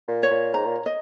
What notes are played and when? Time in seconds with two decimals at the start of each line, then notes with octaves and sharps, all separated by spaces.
0.08 A#2
0.23 C#5
0.31 A#2
0.54 G#2 A#5
0.66 A#2
0.86 D#5